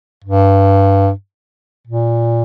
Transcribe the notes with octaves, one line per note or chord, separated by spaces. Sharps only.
G2
A#2